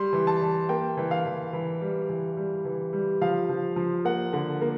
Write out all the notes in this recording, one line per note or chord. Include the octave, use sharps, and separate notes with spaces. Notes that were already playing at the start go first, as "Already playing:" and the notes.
Already playing: G3 C6
E3
A5
E3
A#3 G5
E3
F5
E3
E3
G3
E3
G3
E3
G3
F3 F5
F3
F3
A#3 F#5
D3
A#3